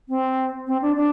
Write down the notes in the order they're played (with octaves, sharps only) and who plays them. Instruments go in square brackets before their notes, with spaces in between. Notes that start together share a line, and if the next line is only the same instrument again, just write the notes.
[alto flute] C4
C4
D4
D4